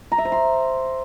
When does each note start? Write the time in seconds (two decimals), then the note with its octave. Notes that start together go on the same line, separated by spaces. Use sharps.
0.12 A#5
0.18 E5
0.25 C5
0.32 C6